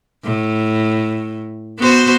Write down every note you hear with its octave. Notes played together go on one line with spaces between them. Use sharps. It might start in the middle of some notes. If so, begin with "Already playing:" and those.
A2
B3 F#4 C5